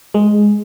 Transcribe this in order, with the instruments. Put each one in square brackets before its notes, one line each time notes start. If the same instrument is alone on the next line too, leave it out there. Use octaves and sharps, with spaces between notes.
[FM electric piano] G#3